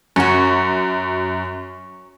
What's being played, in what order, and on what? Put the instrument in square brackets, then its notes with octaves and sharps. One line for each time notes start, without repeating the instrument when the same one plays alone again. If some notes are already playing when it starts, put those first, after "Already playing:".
[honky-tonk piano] F#2 [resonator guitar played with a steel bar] C#4 F#4